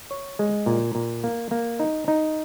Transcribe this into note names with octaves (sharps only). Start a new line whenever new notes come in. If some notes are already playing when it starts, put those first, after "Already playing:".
C#5
G#3
A#2
A#2
A#3
A#3
D#4
D#4